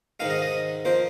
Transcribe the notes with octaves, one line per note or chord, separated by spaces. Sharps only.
G#2 D#3 G#3 F5
D#5
D#5
F3 A#3 C5